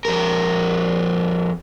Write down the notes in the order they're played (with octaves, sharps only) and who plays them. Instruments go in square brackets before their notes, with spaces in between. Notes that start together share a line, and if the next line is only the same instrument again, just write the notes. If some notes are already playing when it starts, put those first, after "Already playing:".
[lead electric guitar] F2 A#4